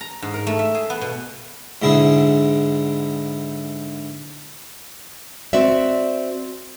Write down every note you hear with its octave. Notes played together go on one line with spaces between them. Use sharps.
A#5
G#2
A#4
A3
E5
G#4
B3
B2
G#2 D3 E4 G#4
C4 F#4 D5 E5